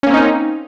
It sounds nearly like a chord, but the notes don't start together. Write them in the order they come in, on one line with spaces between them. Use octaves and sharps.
C#4 A#3 C4 D#4